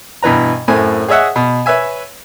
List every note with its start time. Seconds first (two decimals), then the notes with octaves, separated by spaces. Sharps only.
0.23 G2 B2 E3 B4 A#5
0.68 F#2 A2 C4 G#5
1.08 G#4 C#5 D#5 E5 F#5
1.36 B2
1.66 B4 C#5 E5 G#5